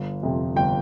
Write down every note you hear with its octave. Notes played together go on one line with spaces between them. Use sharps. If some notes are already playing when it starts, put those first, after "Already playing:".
Already playing: G1
F2 C3
G1 G5